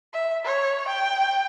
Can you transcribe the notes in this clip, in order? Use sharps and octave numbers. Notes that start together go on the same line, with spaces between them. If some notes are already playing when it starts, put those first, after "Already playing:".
E5
C#5
G5